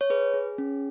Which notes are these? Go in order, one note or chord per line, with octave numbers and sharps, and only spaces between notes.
C#5
G#4 B4
G#4
C#4